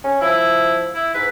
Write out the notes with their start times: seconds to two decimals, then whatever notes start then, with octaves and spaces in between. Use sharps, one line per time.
0.04 C#4
0.21 F3 E4
0.95 E4
1.14 G#2 B4